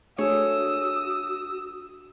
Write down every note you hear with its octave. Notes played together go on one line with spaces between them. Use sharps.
A3 D4 F#4 G#4 C#5 D#6 E6